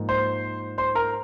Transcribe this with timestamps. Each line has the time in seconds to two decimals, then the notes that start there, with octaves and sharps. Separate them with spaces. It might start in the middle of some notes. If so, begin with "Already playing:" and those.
Already playing: G#2 F3 A#3
0.09 C5 C6
0.78 C5 C6
0.95 A#4 A#5